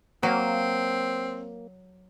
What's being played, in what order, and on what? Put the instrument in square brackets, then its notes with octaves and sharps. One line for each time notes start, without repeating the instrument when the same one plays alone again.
[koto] F#3 [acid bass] A#3 [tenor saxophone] C4